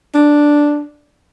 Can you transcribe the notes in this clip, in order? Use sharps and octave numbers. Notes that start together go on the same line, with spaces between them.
D4